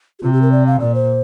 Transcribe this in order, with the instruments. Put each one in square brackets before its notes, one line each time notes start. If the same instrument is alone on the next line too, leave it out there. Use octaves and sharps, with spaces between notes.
[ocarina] G4
[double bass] C3 [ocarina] F4
[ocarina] G4
A#4
D5
F5
[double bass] A#2 [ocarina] D5
[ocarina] C5